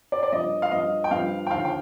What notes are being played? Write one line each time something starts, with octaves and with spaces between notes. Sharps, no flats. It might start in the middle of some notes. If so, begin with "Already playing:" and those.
D5
D5
G2 F3 D#5
F5
G2 F3 D#5
G5
G2 F3 F5
G5
D#2 D3 F3 F5
G5